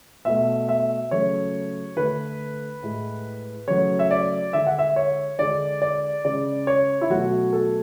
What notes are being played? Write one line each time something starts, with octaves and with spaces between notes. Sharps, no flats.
B2 A3 E5
E5
C#3 F#3 A3 C#5
D3 A3 B4
A2 G#3
C#3 F#3 A3 C#5
E5
D5
D3 G#3 E5
F#5
E5
C#5
D3 G#3 D5
D5
C#3 G#3 D5
C#5
E4
B2 F#3 A3 F#4
A4